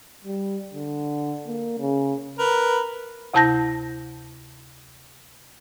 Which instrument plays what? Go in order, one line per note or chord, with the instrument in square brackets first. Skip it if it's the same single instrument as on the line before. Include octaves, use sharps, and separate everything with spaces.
[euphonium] G3
D3
A#3
C#3
[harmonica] A#4 B4
[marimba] D2 C3 E4 A5 G6 A#6